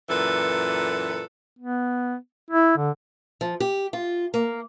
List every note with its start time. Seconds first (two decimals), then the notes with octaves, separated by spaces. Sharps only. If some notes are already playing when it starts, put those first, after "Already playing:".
0.08 F#2 A#2 E3 A4 B4
1.59 B3
2.50 E4
2.77 D3
3.41 F3
3.60 G4
3.93 F4
4.34 A#3